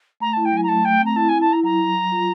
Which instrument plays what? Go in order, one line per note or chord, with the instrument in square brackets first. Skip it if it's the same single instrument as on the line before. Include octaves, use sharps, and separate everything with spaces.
[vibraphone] A3 [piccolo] A#5
[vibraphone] E4 [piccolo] A5
[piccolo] G5
[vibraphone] F#3 [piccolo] G#5
[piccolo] A#5
[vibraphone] A3 [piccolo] A5
[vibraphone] A3 [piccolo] G5
[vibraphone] C4
[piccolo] A#5
[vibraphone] E4 [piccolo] A5
[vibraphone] E4 [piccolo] G#5
[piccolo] A5
[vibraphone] E4 [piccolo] A#5
[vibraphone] F#3 [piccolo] A#5
[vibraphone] F#3
F#3
F4